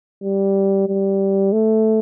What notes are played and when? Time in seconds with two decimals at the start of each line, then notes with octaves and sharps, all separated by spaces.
0.23 G3
0.88 G3
1.52 A3